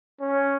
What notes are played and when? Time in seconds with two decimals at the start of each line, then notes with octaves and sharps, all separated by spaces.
0.21 C#4